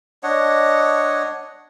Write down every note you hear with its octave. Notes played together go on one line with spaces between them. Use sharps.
D4 C#5 D#5 F#5